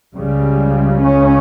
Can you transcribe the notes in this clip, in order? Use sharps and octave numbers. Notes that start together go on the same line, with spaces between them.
C#2 C#3 G3
C#4